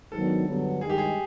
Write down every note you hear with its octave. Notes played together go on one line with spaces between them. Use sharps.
G#2 D#3 F#3 B3 D4 A4
G2 D3 F#3 B3
G2 D#3 G#3 G#4
G4
G#4